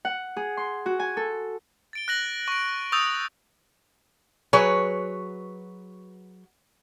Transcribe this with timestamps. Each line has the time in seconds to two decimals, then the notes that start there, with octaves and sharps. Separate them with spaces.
0.05 F#5
0.37 G#4
0.57 C6
0.86 F#4
1.00 G#5
1.17 A4
1.93 A6 D7 G7
2.08 F#6 A#6 F#7
2.48 C#6 D7
2.92 C#6 D#6 E6 G6 A6 F7
4.53 F#3 G#4 B4 C#5